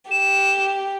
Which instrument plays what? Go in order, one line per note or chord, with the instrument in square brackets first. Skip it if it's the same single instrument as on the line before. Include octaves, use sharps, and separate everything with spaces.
[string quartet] G4 [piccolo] E7